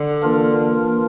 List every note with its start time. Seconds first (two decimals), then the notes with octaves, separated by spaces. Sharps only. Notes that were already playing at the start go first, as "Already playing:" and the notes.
Already playing: D3
0.23 E3 A#3 D4 F4 A#4